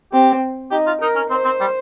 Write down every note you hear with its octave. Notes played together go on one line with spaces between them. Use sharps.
C4 G4
D#4 G4
F4
D#4 A#4
C#4
C4 C5
C4
G3